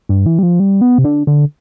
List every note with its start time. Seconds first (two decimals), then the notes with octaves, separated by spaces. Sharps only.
0.09 G2
0.26 E3
0.39 G3
0.43 F3
0.60 G3
0.81 B3
0.98 C3
1.04 D3
1.27 D3